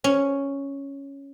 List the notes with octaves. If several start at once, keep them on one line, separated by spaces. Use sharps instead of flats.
C#4